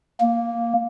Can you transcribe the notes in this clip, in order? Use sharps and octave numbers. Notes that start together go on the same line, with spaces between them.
A#3